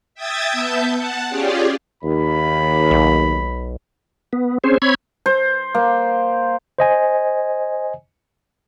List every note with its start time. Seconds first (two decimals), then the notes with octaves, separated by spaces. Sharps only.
0.15 E5 G5 D#6 G#6 A6
0.52 B3 E5 A5 G6
0.95 F#5 A5
1.29 C#4 F4 G4 G#4 D5
2.03 D#2 B5
2.91 B1
4.33 B3
4.64 C4 C#4 G#4 C5
4.82 C4 C#5 B5 G#6
5.26 C5
5.75 A#3
6.79 C5 D#5 G#5